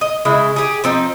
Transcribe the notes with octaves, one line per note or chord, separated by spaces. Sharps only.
D#5
C#3 G#3 E4
G4 G#4
F3 C4 D#4